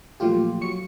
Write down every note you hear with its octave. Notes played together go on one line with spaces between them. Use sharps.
A#2 F3 F#3 A3 F4 G4
F#3 C#6 C#7